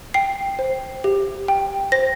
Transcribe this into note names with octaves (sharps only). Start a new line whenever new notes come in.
G5 C7
C5
G4
G5
C5 A#6